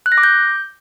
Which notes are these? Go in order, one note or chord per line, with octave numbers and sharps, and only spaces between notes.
F#6
A#6
D6
G6